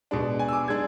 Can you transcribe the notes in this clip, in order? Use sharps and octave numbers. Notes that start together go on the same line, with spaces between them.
B2 G#3 D4
G#5
E6
D6
G#3 D4 G#6